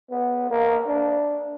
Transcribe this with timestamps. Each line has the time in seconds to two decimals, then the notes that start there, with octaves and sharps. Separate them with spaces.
0.11 B3
0.51 A#3
0.88 D4